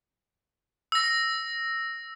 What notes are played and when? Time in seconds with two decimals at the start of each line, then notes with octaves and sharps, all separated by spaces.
0.92 E6 A#6